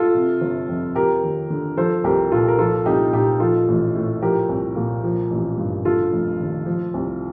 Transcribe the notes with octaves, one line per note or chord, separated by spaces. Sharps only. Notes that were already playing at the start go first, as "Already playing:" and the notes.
Already playing: F4 A4
C3
G1
F2
F3 G4 A#4
D#2
D3
F3 A4 C5
C2 G4 A#4
A#2 F4 A4
A#4
F3 F4 A4
C2 D#4 G4
A#2 D#4 G4
F3 F4 A4
A1
A2
F3 G4 A#4
C2
A#2
F3
A1
G2
D3 F4 A4
F1
D#2
F3
C2